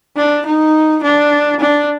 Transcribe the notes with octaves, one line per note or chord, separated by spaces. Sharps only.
D4
D#4
D4
D4